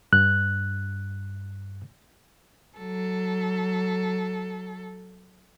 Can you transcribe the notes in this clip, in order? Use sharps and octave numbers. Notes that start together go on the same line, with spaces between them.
G2 F#6
F#3 A4